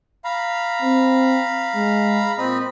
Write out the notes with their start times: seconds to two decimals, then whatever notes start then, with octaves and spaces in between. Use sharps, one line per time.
0.25 F5 A#5 B5
0.82 C4
1.75 G#3
2.38 A#2 C4 D#5 B5